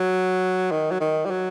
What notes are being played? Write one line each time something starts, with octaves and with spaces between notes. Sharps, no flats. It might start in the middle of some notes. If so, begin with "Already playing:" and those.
Already playing: F#3
D#3
F#3
D#3
G3
F#3